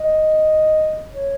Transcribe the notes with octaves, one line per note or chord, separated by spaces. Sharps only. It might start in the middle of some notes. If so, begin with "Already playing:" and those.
Already playing: D#5
C#5